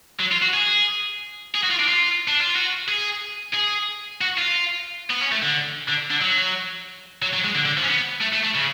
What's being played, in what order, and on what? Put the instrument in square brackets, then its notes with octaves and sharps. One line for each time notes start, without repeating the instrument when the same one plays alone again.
[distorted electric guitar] F#3
F4
F#4
G#4
G#4
F#4
F4
D4
F4
D4
F4
F#4
G#4
G#4
F#4
F4
B3
C#4
A3
D3
D3
D3
F#3
F#3
F#3
G#3
D3
D3
F3
C#4
B3
A3
A3
A3
C#3